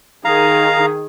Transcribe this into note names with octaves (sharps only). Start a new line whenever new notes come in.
D#3 G#4 F5 A#5